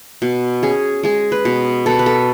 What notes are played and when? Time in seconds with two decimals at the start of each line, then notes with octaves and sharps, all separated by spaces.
0.22 B2
0.63 C#4 G#4
1.03 G#3 G#4
1.32 B4
1.45 B2
1.86 B2 A4
1.99 B4
2.06 A4